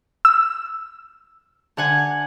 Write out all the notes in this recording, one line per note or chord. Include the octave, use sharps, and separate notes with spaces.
E6
D3 F#5 G#5